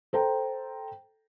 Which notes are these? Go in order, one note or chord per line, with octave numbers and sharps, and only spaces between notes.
A4 C5 G5 A#5